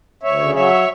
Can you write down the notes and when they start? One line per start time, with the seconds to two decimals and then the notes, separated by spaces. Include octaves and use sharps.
0.23 D2 C#5 E5
0.40 C#3
0.55 F#3 C#5 E5